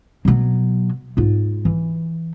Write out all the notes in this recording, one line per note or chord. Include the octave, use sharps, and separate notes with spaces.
B2 F#3
G#2 F4
E3